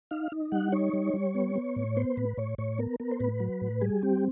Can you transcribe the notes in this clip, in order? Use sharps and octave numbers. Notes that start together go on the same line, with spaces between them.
D#4 F5
D#4
G3 F#5
D#4 C#5
G3
G3
B3
B3
A2
B3 C5
A2 B4
A2 C#5
A2 C#5
B3 A#4
B3 A#4
C5
A2 B4
F#3
A2
G3 G#4
C4 G4